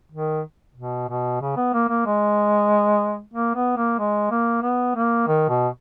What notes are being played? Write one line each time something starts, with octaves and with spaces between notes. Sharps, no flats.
D#3
B2
B2
C#3
B3
A#3
A#3
G#3
A#3
B3
A#3
G#3
A#3
B3
A#3
D#3
B2